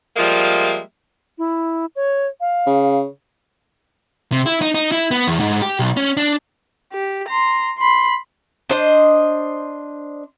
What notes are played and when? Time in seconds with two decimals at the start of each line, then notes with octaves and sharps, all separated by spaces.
0.16 F3 G3 G#3 A#3 E5
1.38 E4
1.96 C#5
2.41 F5
2.67 C#3
4.32 C3
4.46 E4
4.62 D#4
4.74 D#4
4.92 E4
5.11 B3
5.27 E2
5.40 G#2
5.62 G4
5.79 B1
5.97 C#4
6.17 D4
6.93 G4
7.28 A#5 C6
7.79 B5 C6
8.69 D4 C5 D#5